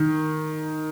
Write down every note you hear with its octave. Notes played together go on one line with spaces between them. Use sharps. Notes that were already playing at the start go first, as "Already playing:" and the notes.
Already playing: D#3